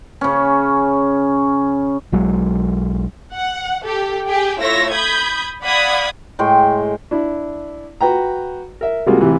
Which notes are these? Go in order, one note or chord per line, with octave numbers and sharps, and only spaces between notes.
C#3 C#4
B1 F#3 G#3
F#5
G4 A4
G4 G#4 G5 G#5
A3 E4 F4 C#5 E6 A#6
B5 D#6 G6 G#6
D5 F5 F#5 B5 D#6 G#6
A2 G#3 G5 C6
D4 E4
F#4 B4 G5 A#5
A#4 E5
C3 G3 G#3 A#3 F4 F#4
A1 C3 E3